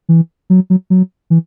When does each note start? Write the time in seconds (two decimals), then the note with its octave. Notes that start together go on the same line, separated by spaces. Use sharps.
0.09 E3
0.50 F#3
0.70 F#3
0.90 F#3
1.30 E3